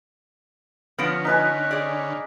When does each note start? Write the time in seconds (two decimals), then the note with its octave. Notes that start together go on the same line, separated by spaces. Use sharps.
0.99 D3 F3 B3 C#4 F6 A#6 D7
1.25 D#4 B4 G#5 B6
1.71 G#4 D5